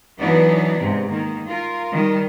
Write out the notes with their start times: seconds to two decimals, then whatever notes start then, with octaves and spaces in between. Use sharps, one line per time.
0.19 E3 F#3 B3 D4 D#4
0.77 G#2 C3
1.09 D#3 A#3
1.48 F4 A#4
1.93 D#3 G3